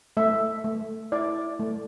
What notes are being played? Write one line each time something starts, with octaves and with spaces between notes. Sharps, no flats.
A3 E5
A3
E4 D5
A3